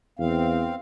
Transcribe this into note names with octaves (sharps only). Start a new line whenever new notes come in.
E2 C4 F5